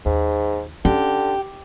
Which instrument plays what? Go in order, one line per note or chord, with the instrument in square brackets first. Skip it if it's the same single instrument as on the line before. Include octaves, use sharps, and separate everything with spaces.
[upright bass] D#2 [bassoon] G#2
[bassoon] D3 [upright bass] C#4 [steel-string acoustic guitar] G4